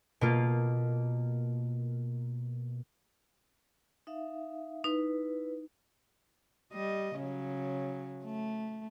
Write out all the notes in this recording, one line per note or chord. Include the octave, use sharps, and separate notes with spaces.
B2 A#3 F4
D#4 E5 F5
D#4 E4 B4
G3 D#5
C#3 F#3
A3